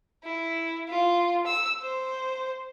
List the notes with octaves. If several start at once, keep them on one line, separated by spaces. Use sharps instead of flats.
E4
F4
E6
C5